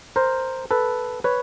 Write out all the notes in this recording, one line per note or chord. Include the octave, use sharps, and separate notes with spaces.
A#4 C5
A4 B4
B4 C#5